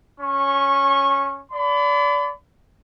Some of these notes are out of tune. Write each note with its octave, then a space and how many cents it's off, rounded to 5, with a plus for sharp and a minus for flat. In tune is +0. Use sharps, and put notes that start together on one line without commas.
C#4 +0 C#6 -20
D5 -30 B5 +35